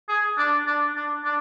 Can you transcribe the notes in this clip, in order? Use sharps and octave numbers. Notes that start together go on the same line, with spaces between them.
G#4
D4
D4
D4
D4